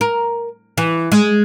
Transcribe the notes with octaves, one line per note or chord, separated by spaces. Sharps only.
A#4
E3
G#3